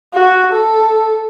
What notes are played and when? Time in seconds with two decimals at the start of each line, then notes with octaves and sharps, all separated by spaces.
0.14 F#4
0.53 A4